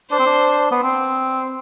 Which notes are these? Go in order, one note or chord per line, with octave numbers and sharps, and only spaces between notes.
D4 C5
C4
D4
B3
C4